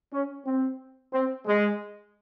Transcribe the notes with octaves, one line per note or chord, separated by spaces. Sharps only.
C#4
C4
C4
G#3